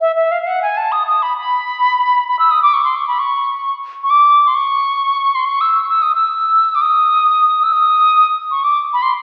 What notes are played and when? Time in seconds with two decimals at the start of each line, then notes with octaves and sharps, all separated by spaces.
0.01 E5
0.16 E5
0.31 F5
0.42 F5
0.47 F#5
0.62 G#5
0.77 A5
0.92 D#6
1.07 D#6
1.22 B5
1.37 B5
2.28 B5
2.39 E6
2.51 D#6
2.62 D6
2.74 C#6
2.84 C6
2.96 C#6
3.07 B5
3.19 C#6
4.03 C#6
4.10 D6
4.47 C6
4.55 C#6
5.35 C6
5.45 C#6
5.61 E6
5.89 E6
6.02 D#6
6.15 E6
6.75 D6
6.81 D#6
7.63 E6
7.72 D#6
8.51 C#6
8.64 D6
8.93 B5
9.02 C6